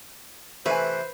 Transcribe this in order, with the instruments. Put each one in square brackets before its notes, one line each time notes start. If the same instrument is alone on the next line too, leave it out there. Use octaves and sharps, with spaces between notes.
[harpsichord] C3 E3 E5 [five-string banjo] A3 G#5 [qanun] B4 [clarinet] C5